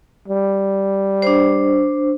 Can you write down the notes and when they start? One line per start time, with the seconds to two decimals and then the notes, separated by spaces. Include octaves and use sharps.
0.28 G3
1.22 D4 C5